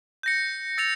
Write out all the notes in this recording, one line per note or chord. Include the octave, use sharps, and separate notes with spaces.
G6 A#6 C#7
E6 A6 C#7 F7